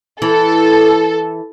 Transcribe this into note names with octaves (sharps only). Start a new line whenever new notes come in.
E3 A4